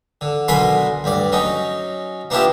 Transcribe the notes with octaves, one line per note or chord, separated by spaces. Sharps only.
D3
B1 D3 A#4 G#5 B5 C6
D2 G2 D5
F#3 C#4 D#4
A#3 B3 D4 E4 F4 G4